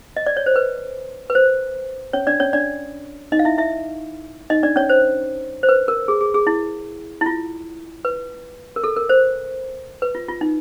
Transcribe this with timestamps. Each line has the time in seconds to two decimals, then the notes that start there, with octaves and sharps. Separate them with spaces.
0.17 D#5
0.26 D5
0.37 C#5
0.46 C5
0.56 B4
1.30 B4
1.35 C5
2.13 C#4 C#5
2.27 D4 D5
2.40 C#4 C#5
2.53 D4 D5
3.32 D#4 D#5
3.39 F5
3.45 E4 E5
3.58 E4 E5
4.50 D#4 D#5
4.63 D4 D5
4.76 C#4 C#5
4.89 C5
5.63 C5
5.69 B4
5.88 A#4
6.08 G#4
6.21 G#4
6.34 G#4
6.47 E4
7.21 E4
7.26 F4
8.05 B4
8.76 A#4
8.84 A4
8.97 A#4
9.09 C5
10.02 B4
10.15 F4
10.28 F4
10.41 D#4